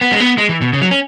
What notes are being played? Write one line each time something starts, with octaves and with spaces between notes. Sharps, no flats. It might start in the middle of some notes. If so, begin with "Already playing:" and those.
B3
G#3
B3
G#3
E3
B2
C#3
F#3
C#4